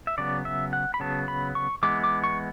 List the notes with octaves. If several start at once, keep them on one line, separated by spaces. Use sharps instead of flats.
E5
C#3 F#3 B3 D5
E5
F#5
B5
C#3 F#3 B3 A5
B5
C#6
E3 G#3 B3 D6
D6
C#6